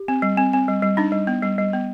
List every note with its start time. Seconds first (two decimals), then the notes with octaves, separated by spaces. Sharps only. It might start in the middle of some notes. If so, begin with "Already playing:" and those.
Already playing: G4
0.08 C4
0.22 G3
0.37 C4
0.53 C4
0.68 G3
0.82 G3
0.97 D4 D#4
1.12 G3
1.27 B3
1.43 G3
1.58 G3
1.73 B3